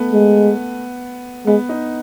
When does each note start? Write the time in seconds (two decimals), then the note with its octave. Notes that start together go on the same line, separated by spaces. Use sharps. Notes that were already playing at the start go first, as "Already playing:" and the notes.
Already playing: A3 B3
0.13 G#3
1.47 G#3 B3
1.69 D#4